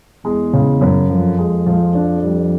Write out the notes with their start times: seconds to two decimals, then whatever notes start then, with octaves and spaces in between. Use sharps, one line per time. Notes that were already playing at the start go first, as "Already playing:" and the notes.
0.24 E2 G#3
0.53 C#3
0.81 F#2
1.10 F2 F3
1.39 G#3
1.66 F3
1.95 D4
2.23 G3